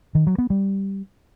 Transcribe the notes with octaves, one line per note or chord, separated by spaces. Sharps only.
D#3
F#3
B3
G3